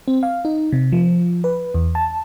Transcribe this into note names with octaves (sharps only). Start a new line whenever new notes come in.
C4
F5
D#4
C3
F3
B4
E2
A5